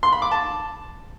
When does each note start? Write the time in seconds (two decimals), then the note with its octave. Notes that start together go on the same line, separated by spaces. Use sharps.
0.03 C6
0.12 B5
0.22 D6
0.31 A5